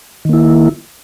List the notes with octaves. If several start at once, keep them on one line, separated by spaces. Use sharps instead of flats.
D#3 A#3 E4